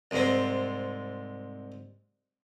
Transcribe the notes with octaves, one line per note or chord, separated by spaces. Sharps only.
C2 G#2 C4